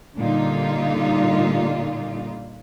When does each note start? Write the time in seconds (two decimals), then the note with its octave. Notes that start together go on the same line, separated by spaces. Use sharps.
0.16 A#2 D3 G3 D#4 F4